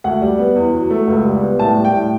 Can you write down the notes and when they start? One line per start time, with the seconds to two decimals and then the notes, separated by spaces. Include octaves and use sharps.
0.04 D2 F#5
0.22 G3
0.39 B3
0.56 E2
0.73 F#3
0.90 A3
1.08 C#2
1.25 G3
1.42 B3
1.59 A2 A5
1.76 G3
1.85 G5
1.94 A2